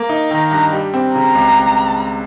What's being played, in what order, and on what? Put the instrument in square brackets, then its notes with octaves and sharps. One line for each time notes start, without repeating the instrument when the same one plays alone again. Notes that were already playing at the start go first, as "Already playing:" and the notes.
Already playing: [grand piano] A#3
D#4
[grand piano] D#3 [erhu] A#5
[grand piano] G2
G3
C4
[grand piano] C#3 [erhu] A#5
[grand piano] C#2